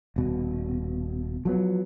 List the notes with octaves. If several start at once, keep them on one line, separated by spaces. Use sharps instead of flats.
D#1 B2
F3 F#3 B3